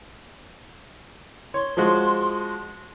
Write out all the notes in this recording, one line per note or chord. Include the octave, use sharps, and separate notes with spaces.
C#5 C6
F3 G#3 F#4